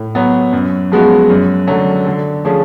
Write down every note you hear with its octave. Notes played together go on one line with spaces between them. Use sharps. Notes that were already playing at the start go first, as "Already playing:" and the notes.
Already playing: A2
F#3 B3
F#2
F3 G#3 B3 F#4
F#2
D3 F#3 A3
D3
F3 A3 C#4 G#4